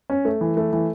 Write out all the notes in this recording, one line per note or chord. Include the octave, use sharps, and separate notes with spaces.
C#4
A3
E3
A3
E3